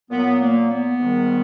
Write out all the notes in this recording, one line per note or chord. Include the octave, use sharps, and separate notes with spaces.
A#2 F#3 B3
A#3
B3
G#2 D#3 G3